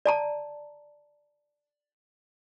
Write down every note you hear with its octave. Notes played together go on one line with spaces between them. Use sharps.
D5 A5 A#5